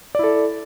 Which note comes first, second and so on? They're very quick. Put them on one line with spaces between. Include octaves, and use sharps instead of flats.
D5 E4 A4